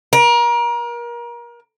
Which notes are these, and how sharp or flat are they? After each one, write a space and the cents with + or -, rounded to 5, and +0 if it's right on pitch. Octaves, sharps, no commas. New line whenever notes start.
A#4 +30